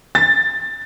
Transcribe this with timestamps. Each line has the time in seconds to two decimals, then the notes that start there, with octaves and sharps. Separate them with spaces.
0.15 A6